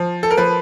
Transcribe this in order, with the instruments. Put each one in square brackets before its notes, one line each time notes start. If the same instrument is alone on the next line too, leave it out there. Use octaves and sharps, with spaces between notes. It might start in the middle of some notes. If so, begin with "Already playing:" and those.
Already playing: [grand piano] F3
A4
A#4
F3 B4